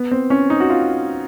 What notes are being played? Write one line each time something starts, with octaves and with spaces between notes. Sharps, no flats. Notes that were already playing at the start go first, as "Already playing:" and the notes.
Already playing: B3
C4
C#4
D#4
F#4
F4